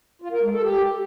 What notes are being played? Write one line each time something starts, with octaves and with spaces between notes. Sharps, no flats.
F4
A#4
G#3
A4
G4